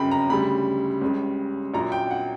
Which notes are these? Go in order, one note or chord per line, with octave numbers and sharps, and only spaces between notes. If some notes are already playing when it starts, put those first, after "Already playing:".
Already playing: G1 F#2 C#3 G5 B5
A#5
D2 C#3 G3 B5
C#2 C#3 G3
A#1 A#2 F#3 A#5
G5
F#5